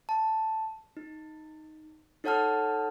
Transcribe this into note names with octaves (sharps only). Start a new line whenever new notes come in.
A5
D#4
D#4 A4 C#5 F#5 A5 F6